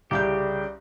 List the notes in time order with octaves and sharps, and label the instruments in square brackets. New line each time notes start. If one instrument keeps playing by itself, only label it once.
[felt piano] C2 F5 G6 [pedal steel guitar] C#3 G4 [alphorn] G3